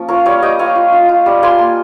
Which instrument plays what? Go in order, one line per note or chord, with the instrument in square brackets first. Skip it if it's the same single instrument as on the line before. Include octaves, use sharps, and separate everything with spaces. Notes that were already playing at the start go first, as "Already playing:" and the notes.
Already playing: [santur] F3 A#3 C#4
F4 A#4 C#5
G3 C#5 F5
G3 D#5 G5
F4 C#5 F5
F4
F4
F4
G3
F4 G#5 C6
A#3